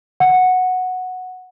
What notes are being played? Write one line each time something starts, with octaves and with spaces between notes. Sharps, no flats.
F#5